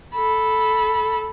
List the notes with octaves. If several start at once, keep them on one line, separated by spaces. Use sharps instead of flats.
A4 B5